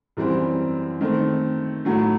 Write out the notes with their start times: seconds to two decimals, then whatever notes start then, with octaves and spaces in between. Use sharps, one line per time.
0.17 F#2 E3 G3 C4
1.01 D#3 A3 C4
1.85 A2 F#3 A3